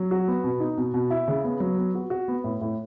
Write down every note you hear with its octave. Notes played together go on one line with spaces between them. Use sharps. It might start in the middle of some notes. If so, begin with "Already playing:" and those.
Already playing: F#3
F#4
B3
B2
D#4
B2
B2
E4
C#3
B3
F#3
B3
F#4
F#4
B3
A2
A2